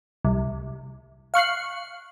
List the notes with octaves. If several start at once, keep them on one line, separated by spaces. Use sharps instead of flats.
C2
F5 C#6 F#6 C7